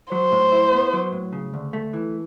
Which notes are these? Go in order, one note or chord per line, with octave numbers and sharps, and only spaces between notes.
F#3 C5
A2
E4
B3
F#3
A2
C#3
D2
A3
E3